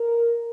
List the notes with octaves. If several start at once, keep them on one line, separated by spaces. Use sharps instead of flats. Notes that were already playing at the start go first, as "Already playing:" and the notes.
Already playing: A#4